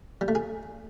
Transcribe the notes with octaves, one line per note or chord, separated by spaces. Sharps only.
G3
A3
G#4